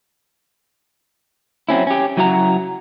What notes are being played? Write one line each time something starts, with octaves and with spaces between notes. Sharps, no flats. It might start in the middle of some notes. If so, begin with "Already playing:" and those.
F#3 C4 C#4 E4
C#4 G4
C#3 F#3 E4 F#4 C#5 A#5